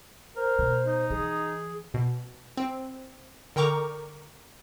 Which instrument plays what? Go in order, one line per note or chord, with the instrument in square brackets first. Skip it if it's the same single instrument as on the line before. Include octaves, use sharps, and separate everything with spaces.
[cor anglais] A#4 [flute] C5
[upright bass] B2
[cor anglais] D#4
[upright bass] E3 [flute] G#4
[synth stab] B2
C4
D3 A#4 G5 A#5 C#6 D6